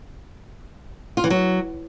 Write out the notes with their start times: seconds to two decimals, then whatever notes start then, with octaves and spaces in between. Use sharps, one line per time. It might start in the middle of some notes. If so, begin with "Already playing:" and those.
1.17 F4
1.24 E3
1.30 F#3